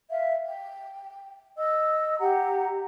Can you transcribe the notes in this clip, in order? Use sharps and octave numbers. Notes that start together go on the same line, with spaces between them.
E5 F5
G5
D#5 E6
G4 F#5 A#5